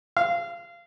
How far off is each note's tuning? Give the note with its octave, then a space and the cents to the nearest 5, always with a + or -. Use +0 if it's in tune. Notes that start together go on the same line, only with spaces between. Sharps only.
F5 -25